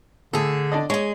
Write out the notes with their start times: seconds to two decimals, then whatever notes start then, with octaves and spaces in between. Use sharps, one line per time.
0.33 A2 D3 G#4 A4
0.72 D4 D5 D#5
0.90 G#3 G#4 C#5